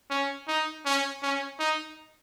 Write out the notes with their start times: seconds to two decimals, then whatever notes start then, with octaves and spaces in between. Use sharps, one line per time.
0.10 C#4
0.48 D#4
0.85 C#4
1.23 C#4
1.59 D#4